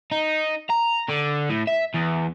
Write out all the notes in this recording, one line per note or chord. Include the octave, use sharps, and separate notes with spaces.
D#4
A#5
D3
A2
E5
E2